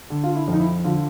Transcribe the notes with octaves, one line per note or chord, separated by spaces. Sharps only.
D3
F4
E4
F2 D#4
E4
D3 F4